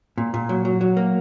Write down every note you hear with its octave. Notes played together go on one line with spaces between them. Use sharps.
A#2
A#2
F#3
F#3
F#3
A#3